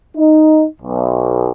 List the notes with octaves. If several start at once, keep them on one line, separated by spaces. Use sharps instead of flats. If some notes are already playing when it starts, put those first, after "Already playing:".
D#4
B1